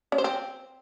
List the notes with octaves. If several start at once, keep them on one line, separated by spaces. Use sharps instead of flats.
C#4
C5
C4